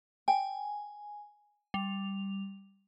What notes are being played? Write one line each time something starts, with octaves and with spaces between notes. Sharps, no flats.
G5 G#5
G3 F7